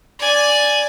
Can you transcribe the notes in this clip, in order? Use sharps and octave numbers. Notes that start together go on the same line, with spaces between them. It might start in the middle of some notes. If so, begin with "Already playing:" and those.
D5 G#5